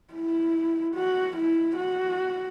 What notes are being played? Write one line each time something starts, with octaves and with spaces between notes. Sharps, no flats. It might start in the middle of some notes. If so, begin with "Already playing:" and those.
E4
F#4
E4
F#4